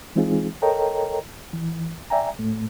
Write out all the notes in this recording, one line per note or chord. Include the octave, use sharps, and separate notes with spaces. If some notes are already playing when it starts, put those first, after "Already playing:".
E3 G#3 C4 D#4 F4 G#4
A4 A#4 C#5 D#5 G5 A#5
E3
D5 E5 G5 G#5 A#5
A2 A3